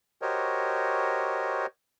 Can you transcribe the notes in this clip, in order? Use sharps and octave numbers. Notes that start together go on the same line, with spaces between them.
F#4 G4 A#4 C5 C#5 D#5